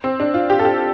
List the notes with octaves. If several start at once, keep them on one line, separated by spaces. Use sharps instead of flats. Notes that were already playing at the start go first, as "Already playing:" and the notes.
C4
D4
F4
G4
A4
G4